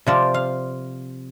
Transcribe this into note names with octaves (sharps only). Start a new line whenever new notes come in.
C3 F3 C4 F4 D5
F5